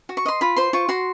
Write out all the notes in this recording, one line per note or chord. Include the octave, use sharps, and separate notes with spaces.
F#4
C#6
D#5 C6
F4 B5
C5 C6
F4 C#6
F#4 C6